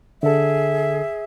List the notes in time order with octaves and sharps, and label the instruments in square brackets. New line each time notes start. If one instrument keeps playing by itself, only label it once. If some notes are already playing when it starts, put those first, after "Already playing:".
[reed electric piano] D3 A4 [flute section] G#4 E5